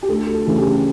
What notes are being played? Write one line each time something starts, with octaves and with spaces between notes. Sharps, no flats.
G4
D2 A4
A4
C#3 E3 A3
G4